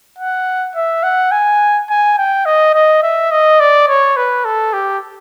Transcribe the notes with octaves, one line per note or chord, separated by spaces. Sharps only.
F#5
E5
F#5
G#5
G#5
G5
D#5
D#5
E5
D#5
D5
C#5
B4
A4
G4